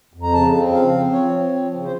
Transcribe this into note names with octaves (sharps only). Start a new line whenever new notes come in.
F2
A#5
C#3 A5
C4
F3 F5
C4
F3 C#5
C4
F3
C#3
C5